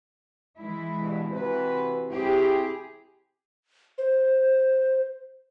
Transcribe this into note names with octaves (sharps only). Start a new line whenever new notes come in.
E3 G#3 E4
G2 B2
C3 E3 F#4 B4
C4 E4 G4 G#4
C5